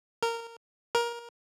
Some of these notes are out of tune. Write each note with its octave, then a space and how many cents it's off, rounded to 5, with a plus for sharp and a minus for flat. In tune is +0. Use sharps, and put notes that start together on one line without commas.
A#4 -15
A#4 +20